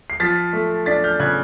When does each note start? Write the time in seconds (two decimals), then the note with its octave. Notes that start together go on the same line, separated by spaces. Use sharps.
0.10 C7
0.20 F3 A6 B6
0.53 A3
0.86 D4 A6 B6
1.04 F6 G6
1.20 C#3 F#6 G#6